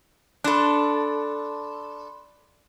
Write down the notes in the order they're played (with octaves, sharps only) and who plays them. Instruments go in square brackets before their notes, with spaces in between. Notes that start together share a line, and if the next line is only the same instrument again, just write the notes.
[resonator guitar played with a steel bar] D4 A4 [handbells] B5 C6 F#6